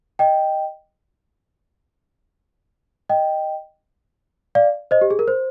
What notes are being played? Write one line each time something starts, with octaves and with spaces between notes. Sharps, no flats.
D#5 G5
D#5 G5
D5 F5
C5 D#5
G4
G#4
A#4
C5